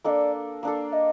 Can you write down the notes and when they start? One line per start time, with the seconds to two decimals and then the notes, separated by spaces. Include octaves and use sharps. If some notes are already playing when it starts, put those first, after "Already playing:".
0.04 A#3 D4 A4 D5 D#5
0.63 A#3 D4 A4 F5
0.93 D#5